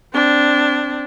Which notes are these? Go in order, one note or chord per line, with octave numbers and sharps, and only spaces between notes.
C4 D4